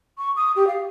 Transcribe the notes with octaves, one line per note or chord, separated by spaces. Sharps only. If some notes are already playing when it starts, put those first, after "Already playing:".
C#6
D#6
G4
F5